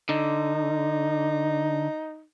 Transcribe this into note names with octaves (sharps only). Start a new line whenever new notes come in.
D3 D#4